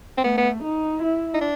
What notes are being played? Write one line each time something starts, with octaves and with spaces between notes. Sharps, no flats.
C4
A3 B3
B3
D#4
E4
D#4
D4